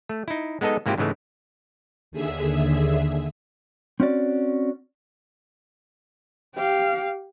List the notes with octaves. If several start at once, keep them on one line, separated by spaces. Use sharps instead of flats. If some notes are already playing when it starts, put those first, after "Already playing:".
A3
D#4 E4
G#3 B3 D#4 A4 D#5
G#2 A#3 C4 E4 F4 G4
G#2 C#3 E3 G#3 A3
D#2 D3 G#4 E5
C4 C#4 F#4 D5
G4 F5